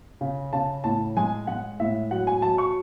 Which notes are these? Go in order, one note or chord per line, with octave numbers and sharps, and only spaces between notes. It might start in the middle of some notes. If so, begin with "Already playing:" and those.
C#3
C#3 A5
A2 A5
G#3 G#5
G#3 F#5
A2 E5
F#3 F#5
G#5
F#3 A5
C#6